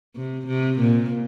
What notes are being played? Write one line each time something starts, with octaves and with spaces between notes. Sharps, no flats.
C3
C3
A#2